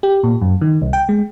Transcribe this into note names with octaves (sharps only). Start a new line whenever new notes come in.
G4
A#2
F#2
D#3
C2
G5
G#3